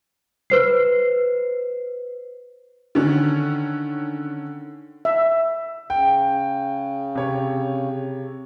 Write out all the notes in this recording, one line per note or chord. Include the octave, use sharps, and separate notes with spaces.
B4 C5 C7
D3 D#3 C#4
E5
C#3 G5
C3 C#5